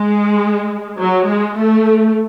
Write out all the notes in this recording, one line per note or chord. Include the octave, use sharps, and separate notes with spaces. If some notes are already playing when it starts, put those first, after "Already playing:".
Already playing: G#3
F#3
G#3
A3